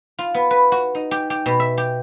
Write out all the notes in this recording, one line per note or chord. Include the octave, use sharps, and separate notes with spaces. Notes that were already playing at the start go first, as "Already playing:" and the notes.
F4
B3
B4
F#4
D#4
G4
G4
B2
E5
G4